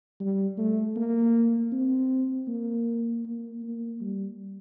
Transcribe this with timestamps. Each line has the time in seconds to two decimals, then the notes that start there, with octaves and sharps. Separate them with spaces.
0.20 G3
0.58 A3
0.96 A#3
1.72 C4
2.48 A#3
3.25 A#3
3.63 A#3
4.01 G3